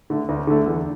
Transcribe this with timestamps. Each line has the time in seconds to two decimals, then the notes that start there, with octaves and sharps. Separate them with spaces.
0.10 D3 A3
0.29 D2
0.47 D3 A3
0.66 E2